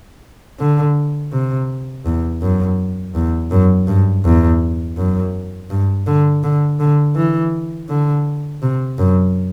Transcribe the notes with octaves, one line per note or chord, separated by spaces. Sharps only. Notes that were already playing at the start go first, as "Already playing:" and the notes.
D3
C3
E2
F#2
E2
F#2
G2
E2
F#2
G2
D3
D3
D3
E3
D3
C3
F#2